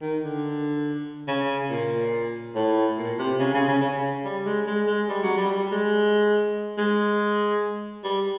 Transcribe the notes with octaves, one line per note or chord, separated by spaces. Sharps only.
D#3
D3
C#3
A#2
A2
A#2
C3
C#3
C#3
C#3
C#3
G3
G#3
G#3
G#3
G3
F#3
G3
G3
G#3
G#3
G3